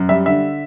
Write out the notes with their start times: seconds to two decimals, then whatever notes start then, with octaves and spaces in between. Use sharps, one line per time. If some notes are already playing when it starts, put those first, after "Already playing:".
Already playing: F#2
0.09 G3 E5
0.26 D3 E5